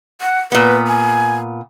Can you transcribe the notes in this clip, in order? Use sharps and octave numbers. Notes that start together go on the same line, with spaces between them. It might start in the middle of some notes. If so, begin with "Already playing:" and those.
F#5
A#2 B3 B4
G#5